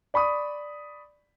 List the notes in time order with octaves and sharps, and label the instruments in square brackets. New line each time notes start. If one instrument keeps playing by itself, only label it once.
[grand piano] D5 B5 C#6 D#6